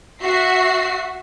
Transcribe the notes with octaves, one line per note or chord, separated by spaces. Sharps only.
F#4 E5 C7